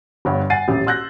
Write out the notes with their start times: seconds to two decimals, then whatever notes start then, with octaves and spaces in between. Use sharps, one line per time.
0.25 G1 G2 C#5 F#5
0.50 F#5 G#5 A6 C7 D#7
0.68 D#1 A1 G4
0.86 C6 E6 F#6 G6 A#6